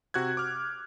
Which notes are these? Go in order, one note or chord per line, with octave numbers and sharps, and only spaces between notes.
C3 F#4 F#6 G#6
D6 F6